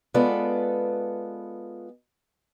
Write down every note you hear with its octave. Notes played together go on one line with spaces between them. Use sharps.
G#3 B3 F4 A4 B4 D5